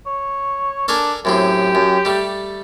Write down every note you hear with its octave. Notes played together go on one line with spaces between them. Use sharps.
C#5
D4 A4 A#4 G#5
F#2 A2 C4 G4
F#2
G3 A3